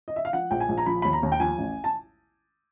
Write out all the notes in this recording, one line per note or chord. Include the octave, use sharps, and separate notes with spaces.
D#5
E5
F5
F3 F#5
A#1 G5
G#5
A#1
A#5
F3 B5
D#2 B5
A#5
D#2
G5
F3 G#5
A1
A5